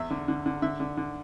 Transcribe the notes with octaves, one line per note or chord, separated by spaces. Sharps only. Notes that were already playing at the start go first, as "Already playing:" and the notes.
Already playing: E2 E5
D3
D3
D3
D3 E5
D3
D3